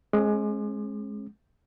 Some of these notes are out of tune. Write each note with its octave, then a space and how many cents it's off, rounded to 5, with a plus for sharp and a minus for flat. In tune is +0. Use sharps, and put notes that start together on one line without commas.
G#3 +15 C#4 -45 D6 +40